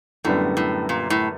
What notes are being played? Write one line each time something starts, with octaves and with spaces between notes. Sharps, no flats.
F#2 A2 D3 G3 B3
A2
A#2
A2